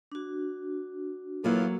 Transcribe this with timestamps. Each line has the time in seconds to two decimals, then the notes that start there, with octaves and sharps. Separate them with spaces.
0.12 D4 F#4
1.44 A2 E3 F#3 A#3 F4